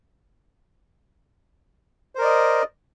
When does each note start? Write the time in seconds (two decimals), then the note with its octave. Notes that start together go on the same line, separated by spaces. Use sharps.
2.15 C5
2.18 A#4
2.21 D5
2.24 D#5